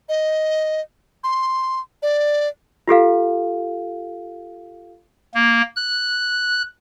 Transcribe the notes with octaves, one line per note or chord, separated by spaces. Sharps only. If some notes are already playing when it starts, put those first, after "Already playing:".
D#5
C6
D5
F4 G4 A4 F5
A#3
F#6